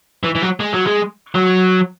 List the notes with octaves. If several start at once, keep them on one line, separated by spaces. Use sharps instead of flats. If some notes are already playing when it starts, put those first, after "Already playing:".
E3
E3
F#3
G#3
F#3
G#3
F#3